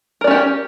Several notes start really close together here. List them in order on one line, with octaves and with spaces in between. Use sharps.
A#4 D5 C#4 G4